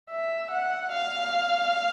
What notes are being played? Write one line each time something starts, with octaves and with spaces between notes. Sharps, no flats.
E5
F#5
F5